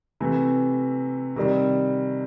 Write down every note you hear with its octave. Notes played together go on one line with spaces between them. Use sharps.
C3 E3 A3
C3 D#3 G3